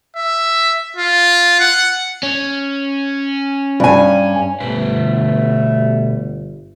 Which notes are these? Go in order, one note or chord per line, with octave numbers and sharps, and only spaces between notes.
E5
F4
F#5
C#4
G2 G#5
G1 B2 A3 B4 C5